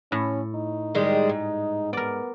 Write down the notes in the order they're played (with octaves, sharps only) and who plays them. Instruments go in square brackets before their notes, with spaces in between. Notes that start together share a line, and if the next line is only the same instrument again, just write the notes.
[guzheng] A2 [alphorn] C#4
[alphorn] D#4
[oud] D#3 G3 G#3
G#2
[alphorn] B3 [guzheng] A#4 D5